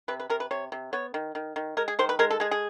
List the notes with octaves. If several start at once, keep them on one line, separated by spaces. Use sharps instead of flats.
C3 B4
B4
C3 A#4
B4
C3 C#5
C3
B3 C#5
D#3
D#3
D#3
G#3 A#4
G#4
D#3 C5
B4
G#3 A#4
A4
G#3 G#4
G#4